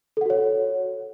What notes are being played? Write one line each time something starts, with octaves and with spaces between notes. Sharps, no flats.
F#4 A4 C#5 F#5